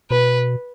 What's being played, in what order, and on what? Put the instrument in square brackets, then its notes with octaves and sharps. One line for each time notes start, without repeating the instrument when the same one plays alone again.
[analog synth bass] B2 [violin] B4